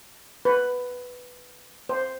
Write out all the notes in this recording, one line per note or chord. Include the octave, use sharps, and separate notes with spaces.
B4
C5